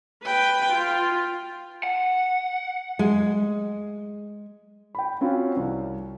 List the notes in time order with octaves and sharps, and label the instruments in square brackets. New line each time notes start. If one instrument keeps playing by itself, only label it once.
[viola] B4 G5
F4
[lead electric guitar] F#5
[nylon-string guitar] G#3
[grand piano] G5 B5
C4 C#4 F4 F#4
C2